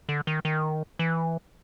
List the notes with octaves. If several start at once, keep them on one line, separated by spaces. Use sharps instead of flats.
D3
D#3
D#3
E3